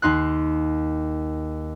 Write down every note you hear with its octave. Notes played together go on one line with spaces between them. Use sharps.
D#2 D#4 C6 F#6